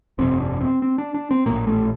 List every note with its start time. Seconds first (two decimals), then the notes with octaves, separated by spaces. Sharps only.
0.18 G1 F2 C3 C4
0.40 D4
0.61 C4
0.82 C4
0.98 D4
1.14 D4
1.31 C4
1.46 A#1 A2 A#3
1.67 A3